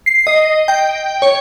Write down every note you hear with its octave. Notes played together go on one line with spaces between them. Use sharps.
C7
D#5
G5
C#5